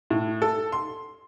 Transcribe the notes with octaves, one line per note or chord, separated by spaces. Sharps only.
A2
A4
C6